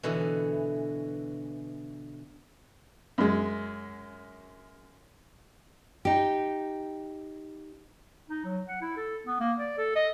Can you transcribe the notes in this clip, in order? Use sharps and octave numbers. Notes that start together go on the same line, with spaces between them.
B2 D3 E3
F#2 G#3
D#4 G4
D#4
F#3
F#5
E4
A4
B3
A#3
D5
A4
D#5